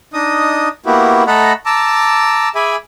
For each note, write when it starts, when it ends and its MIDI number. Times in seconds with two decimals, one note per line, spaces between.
0.14 0.69 62
0.14 0.69 63
0.14 0.69 75
0.14 0.69 87
0.86 1.24 58
0.86 1.24 59
0.86 1.24 64
0.86 1.24 66
0.86 1.24 67
1.27 1.53 57
1.27 1.53 69
1.27 1.53 75
1.27 1.53 78
1.27 1.53 82
1.27 1.53 83
1.66 2.49 81
1.66 2.49 82
1.66 2.49 86
1.66 2.49 88
2.55 2.76 68
2.55 2.76 76
2.55 2.76 80
2.55 2.76 83
2.55 2.76 86